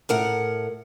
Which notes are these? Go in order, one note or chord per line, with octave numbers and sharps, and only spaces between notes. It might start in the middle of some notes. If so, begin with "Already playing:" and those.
A2 A#4 F#5